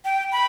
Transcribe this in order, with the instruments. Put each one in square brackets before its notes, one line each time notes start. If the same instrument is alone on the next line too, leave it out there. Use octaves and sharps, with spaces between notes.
[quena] G5
B5